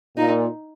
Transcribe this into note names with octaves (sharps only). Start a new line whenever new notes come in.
A#2 D#4